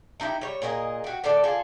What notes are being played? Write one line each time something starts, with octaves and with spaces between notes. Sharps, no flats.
A3 D#4 E4 G4
G3 C#5
A#2 G#4 A#4 D#5
F#4 G4
A2 D3 A4 D5
F4 G#4 A4